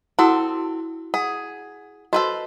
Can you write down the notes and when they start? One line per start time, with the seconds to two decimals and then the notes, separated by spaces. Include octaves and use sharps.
0.19 C4 E4 F#4 A4 F#5 D#6
1.14 G#4 F#5
2.13 F#4 A4 B4 C5 D#5